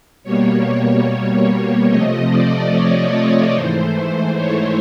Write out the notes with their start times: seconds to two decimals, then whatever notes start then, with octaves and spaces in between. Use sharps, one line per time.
0.24 B2 G3 A#3 C#5
1.89 C3 F3 A3 D#5
2.29 D5
2.71 C#5
3.12 C#5
3.54 G#2 E3 A3 C5
4.36 C#5